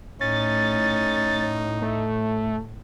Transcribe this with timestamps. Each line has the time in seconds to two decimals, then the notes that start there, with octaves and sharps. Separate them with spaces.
0.21 A2 C#4 D#4 A6
1.82 A3